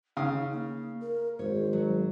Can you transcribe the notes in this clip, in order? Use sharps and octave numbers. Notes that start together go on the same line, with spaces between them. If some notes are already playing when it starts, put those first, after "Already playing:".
C#3 D#4 F5 D#6
A#3
A#4
G#1 C5 C#5
F#3